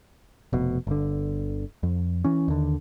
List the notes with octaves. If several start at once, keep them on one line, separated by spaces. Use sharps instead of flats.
F1 B2
G1 D3
F2
E3 C#4
D#2 D3